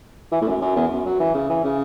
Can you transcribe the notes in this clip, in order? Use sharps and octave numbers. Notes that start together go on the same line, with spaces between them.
E3
A2
F#2
F#2
E2
F#2
F#3
E3
C#3
E3
C#3